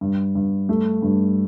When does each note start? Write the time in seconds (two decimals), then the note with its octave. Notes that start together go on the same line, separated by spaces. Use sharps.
0.01 G2
0.35 G2
0.69 A3
1.02 G2